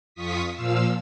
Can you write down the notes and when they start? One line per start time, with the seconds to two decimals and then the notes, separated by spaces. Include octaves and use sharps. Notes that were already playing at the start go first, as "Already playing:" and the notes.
0.15 F2 F4 C#6 D#6 B6
0.53 A#2 F3 F5 E6